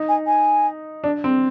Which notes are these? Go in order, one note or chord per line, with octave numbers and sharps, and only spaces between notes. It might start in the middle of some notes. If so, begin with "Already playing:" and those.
Already playing: D#4
G#5
G#5
D4
C4